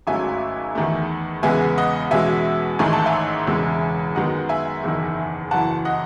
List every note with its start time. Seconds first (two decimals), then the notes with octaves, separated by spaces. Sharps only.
0.07 G#1 G#2 F#3 A3 C#4 E5 G#5
0.75 E2 D#3 A3
1.43 E2 C#3 G#3 B3 E5 G#5
1.78 D#5 F#5
2.11 E2 B2 G#3 C#4 E5 G#5
2.79 A1 G#2 D#3 A3 G#5
2.93 A5
3.06 E5 G#5
3.47 E1 E2 C#3 G#3
4.15 F#2 D#3 G#3 B3 D#5 F#5
4.49 E5 G#5
4.83 F#1 E2 D#3
5.51 F#1 F#2 E3 F#5 A5
5.85 D#5 F#5